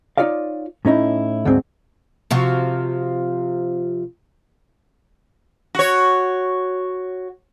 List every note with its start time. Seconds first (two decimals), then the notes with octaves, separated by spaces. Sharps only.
0.18 D#4 F4 C#5 D5 F5
0.85 A2 C#4 D#4 E4
1.45 D2 G#2 F#3 C4
2.31 C3 F3 F#4
5.75 F#4 C#5